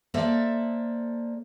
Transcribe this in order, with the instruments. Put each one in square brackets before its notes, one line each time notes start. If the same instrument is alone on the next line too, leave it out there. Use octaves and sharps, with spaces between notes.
[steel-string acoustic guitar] A#3 A4 C5 D5 E5